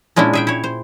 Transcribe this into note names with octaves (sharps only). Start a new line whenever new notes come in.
A#2 G#3 C#4 D4 E4
G#4 E5 G5
E4 C#5
C5